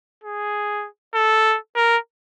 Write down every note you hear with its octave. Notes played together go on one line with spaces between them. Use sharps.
G#4
A4
A#4